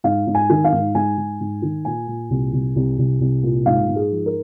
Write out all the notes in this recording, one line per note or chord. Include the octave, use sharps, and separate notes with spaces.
G#2 F5
G#2
G#5
D#3
F5
G#2
G#2 G#5
G#2
G#2
D#3
A#2 G#5
A#2
C2
C2
C2
C2
C2
A#2
G#2 F5
G#2
G#4
F3
A#4